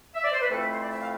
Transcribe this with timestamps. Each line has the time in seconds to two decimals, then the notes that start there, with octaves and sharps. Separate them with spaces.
0.15 E5
0.24 D5
0.32 C5
0.41 B4
0.50 F2 E3 A3 C4 E4 A4
0.60 B4
0.71 C5
0.80 D5
0.91 E5
1.01 F5